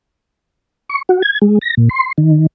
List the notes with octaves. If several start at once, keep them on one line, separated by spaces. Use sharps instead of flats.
C#6
F#4
G#6
G#3
A#6
A#2
C6
D#3